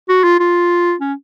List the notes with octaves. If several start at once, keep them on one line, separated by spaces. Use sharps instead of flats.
F#4
F4
F4
C#4